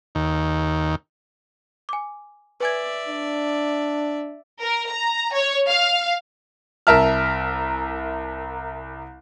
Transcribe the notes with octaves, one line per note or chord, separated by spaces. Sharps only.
D#2
G#5 D6
B4 D5 E5 G#5 G#6
D4
A#4
A#5
C#5
F5
C2 A#4 E5 A5 F6